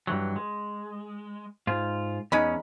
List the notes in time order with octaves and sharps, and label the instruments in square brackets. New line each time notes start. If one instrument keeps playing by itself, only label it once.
[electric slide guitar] G2 E3 F#3
G#3
G#2 F4
[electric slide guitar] E2 C#4 [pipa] G#3 D#4 B5